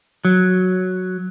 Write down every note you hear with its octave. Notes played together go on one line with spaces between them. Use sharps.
F#3